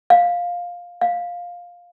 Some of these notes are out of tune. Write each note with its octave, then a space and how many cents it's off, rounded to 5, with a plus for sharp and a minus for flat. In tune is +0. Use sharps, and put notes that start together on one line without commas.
F5 +10
F5 +10